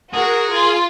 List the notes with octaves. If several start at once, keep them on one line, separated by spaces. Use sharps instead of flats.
F#4 G#4 A#4
F4